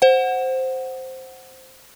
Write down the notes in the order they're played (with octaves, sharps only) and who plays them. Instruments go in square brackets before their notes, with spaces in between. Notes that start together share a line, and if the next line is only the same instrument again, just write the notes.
[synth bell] C5 F#5